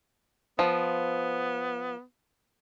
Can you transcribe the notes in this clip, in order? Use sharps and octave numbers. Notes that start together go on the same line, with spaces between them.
F3 B3